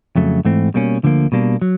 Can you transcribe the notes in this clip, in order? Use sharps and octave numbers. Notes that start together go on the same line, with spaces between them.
F2 C#3 F#3 A3
G#2 E3 A3 C4
B2 G3 A#3 C#4
D2 D3 F3 A#3
B2 G3 A#3 D4
F#3